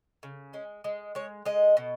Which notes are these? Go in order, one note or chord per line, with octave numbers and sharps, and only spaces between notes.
C#3
G#3 C#4
G#3
G#3 C#5
G#3 D#5
B2